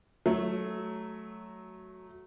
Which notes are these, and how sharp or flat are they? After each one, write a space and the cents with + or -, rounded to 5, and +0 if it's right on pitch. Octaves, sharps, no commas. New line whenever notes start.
F#3 +5 A3 -10